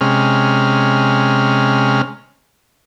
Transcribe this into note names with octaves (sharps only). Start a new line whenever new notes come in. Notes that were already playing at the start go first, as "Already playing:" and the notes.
C3 G#3 C#4 F6